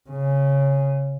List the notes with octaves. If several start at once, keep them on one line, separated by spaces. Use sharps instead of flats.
C#3